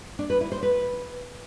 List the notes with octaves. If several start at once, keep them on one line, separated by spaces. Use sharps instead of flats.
D4
B4
E4
C5
B4